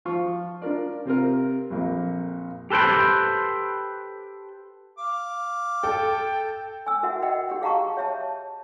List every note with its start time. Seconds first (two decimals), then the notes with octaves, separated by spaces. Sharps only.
0.05 F3 F4 C#6
0.62 D4 F4 A#4 D5
1.05 C3 C4 F4 A#4
1.70 A#1 F2 A#3
2.70 G4 A4 B4 C5 G5
4.98 F5 D6
5.83 A4 G5
6.87 G#5 E6
7.03 F#4 A#4 E5 F#5
7.22 A#4 D#5 F#5 G5
7.49 G4 F#5 G5
7.62 G#4 F5 A5 A#5 C#6
7.97 C#5 E5 A5